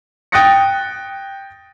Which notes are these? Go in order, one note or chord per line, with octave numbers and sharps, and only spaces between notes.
G5 D#6 F#6 A6 A#6 C#7